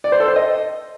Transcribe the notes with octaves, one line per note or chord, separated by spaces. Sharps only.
D5
C5
A4
C5
D#5